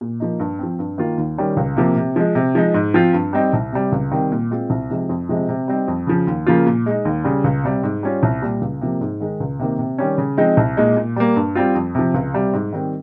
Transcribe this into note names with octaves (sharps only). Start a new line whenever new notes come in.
A#2
F3 A#3 D#4
G2
F3 C4
G2
D#3 A#3 F4
D#2
D#3 G3 C#4
C#2
C3 F3 A#3
C3
F3 G#3
C3
F3 G#3 D#4
G#2
F3 C4 F4
G2
G3 C4 D#4
C2
C3 G3
C#2
C3 D#3 G3 C4
A#2
G#3 C4 F4
C2
C3 F3 G#3 D#4
F2
C3 F3 G#3 C4
C3
G3 C4 D#4
F2
C#3 F3
D#2
C#3 F3 A#3 F4
A#2
G#3 D#4
D#2
C#3 G3
C#2
C3 G3
G#2
G3 C#4 F4
C2
A#2 G3
C#2
C3 F3 A#3
G#2
D#3 G#3 D#4
C#2
C3 D#3 A#3
C3
D#3 G3 C#4
C#3
F3 G#3 C4 D#4
C2
A#2 G#3 D#4
A#2
G3 A#3
G2
G3 C4 F4
F2
C3 F3
C#2
C3 G3
G#2
D#3 G3 C4